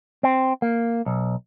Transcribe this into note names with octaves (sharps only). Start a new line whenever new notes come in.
C4
A#3
B1